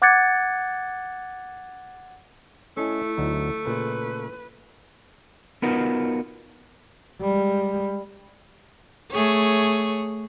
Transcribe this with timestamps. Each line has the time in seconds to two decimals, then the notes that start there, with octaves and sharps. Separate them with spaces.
0.02 F#5 D6 F#6 G#6 A6 C#7
2.77 A3 C#4 E4 D#5 G#5
3.17 D2 F#3 D#4
3.66 A#2 C#3 B4
5.62 B3 D#4 F4 F#4 A#4 B4
7.21 G3 G#3
9.12 A3 G#4 C#5